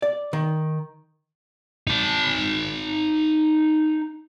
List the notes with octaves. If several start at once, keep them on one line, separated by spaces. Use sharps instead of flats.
D5
D#3
D#4 A5